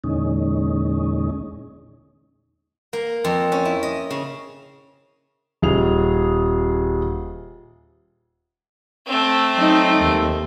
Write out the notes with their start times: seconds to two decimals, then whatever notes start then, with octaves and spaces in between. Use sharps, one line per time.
0.04 E2 A#2 D3 G#3 C#4 D#4
2.93 A#3
3.24 F2
3.52 C#4
3.65 E4
3.83 D#5
4.10 C#3
5.62 D#1 G#4 F7
9.07 A3 C4
9.56 F#3 D#4
10.00 D#2